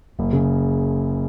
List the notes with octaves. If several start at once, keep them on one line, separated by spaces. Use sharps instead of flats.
F#1
C#3